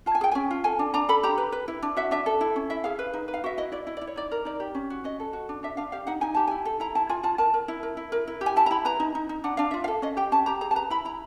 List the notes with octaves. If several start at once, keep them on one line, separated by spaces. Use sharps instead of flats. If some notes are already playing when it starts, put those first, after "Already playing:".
F4 A5
G#5
G#4 G5
C#4 G#5
F4
A4 G#5
D4
D4 A#5
A4 B5
G4 A#5
B4
B4
E4
D4
F#4 E5
D4 E5
A4
E4
C#4
E4 E5
G#4 F5
B4
D#4
B4
F5
F#4 E5
E4 D#5
E4 D5
E4 D#5
E4 D5
C#5
D#4 D5
A#4
D#4 D5
G4
C#4
F#4
C#4 D#5
A4
F#4
D4
D4 E5
D4 F5
G4 F5
D#4 F#5
D#4 G#5
G4 A5
E4 G#5
A4
E4 A#5
E4 A5
F4 G#5
F4 A5
A#4 A5
A#4
E4
A#4
E4
A#4
E4
G4
G#5
E4 A5
A#5
E4 B5
B4 A#5
D#4
D#4
D#4
D4 F#5
D4 F5
F4 E5
F5
A4
C#4 D#5
G4 G5
C#4 A5
G4 A#5
G#4 A#5
A5
B4 A#5
E4 B5
E4 A#5